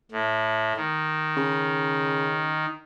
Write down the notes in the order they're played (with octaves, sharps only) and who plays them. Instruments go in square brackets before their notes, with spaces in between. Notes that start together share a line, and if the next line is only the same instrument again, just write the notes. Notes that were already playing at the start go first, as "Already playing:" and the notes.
[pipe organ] A2
D#3
[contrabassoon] C#3